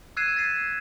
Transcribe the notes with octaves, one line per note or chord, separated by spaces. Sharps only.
E6 F#6 G#6 C7 D#7 E7
A6 B6 C7 D#7 E7